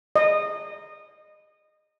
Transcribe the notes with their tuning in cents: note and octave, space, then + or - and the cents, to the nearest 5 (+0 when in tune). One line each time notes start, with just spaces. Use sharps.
D#5 -20